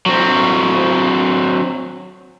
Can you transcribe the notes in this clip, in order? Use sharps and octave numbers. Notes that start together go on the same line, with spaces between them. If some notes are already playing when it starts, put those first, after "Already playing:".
F#3 C4